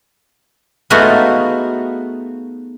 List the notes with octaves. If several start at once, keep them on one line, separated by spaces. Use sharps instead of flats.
A3 B3 D#4 F4 F#4 G#4